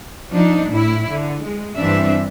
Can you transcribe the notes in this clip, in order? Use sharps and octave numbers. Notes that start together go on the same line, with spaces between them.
F3 D4 D#4
A2 E4
D3
G#3
G2 E3 C4 D4 E5